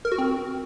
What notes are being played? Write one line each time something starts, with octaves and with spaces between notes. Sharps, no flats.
A#4
F#4
C4